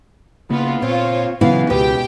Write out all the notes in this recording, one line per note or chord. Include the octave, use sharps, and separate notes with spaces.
C#3 A#3 B3 F4
A#2 C4 F4 C5 C#5
A#2 C#3 E3 F#3 B3 E4 F5
C#2 B2 G4 B4 G5